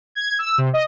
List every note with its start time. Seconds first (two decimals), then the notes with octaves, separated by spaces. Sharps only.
0.15 G#6
0.39 E6
0.58 C3
0.73 D#5